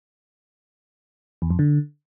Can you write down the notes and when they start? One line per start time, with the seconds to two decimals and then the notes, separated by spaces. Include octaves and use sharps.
1.42 E2
1.50 F2
1.59 D3